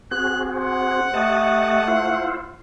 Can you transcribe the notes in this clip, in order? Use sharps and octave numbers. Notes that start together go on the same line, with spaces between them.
C4 F#4 G#4 F#6
C5 F#5
A3 G4 D#5 A5
E4 F4 C5